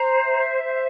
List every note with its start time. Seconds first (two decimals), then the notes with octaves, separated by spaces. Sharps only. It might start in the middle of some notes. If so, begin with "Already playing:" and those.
Already playing: C5 A#5
0.23 E5
0.63 C5